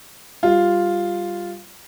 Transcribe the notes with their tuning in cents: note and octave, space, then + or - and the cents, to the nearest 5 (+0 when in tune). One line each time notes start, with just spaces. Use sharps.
G3 +0 F4 +0